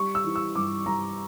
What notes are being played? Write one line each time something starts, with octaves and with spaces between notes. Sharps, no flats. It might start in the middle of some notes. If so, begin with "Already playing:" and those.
Already playing: G3 C#6
E6
E3
E6
G2 D6
G2 A#5